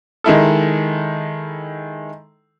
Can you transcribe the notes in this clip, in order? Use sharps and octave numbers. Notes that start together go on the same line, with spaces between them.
D#3 G#3 E4 A4